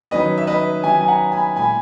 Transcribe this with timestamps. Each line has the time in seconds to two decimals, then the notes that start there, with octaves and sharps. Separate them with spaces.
0.11 D#3 F#3 C#4 B4 D#5
0.38 E5
0.47 B4 D#5
0.84 D#3 F#3 C#4 E5 G#5
1.01 G#5
1.08 F#5 A#5
1.32 G#5 B5
1.56 A#2 G#3 B3 G#5 B5